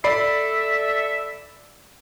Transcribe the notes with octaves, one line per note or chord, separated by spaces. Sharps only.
A4 D5 E5 B5 C7